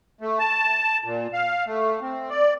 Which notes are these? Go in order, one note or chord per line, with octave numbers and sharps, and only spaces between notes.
A3
A5
A#2
F5
A3
C4
D5